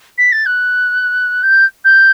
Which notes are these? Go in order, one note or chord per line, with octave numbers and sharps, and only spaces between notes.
B6
A6
F#6
G6
G6